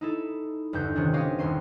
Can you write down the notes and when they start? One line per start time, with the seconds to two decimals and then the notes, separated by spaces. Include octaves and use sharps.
0.01 D#4 E4 A4
0.73 G1 E2 D3 G6
0.96 C3 D#3 C#4 D4
1.14 C4 C#4 G4 D#5 F5
1.39 D#1 E2 C6 D#7